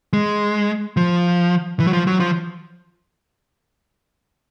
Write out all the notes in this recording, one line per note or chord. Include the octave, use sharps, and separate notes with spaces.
G#3
F3
E3
F#3
F3
F#3
F3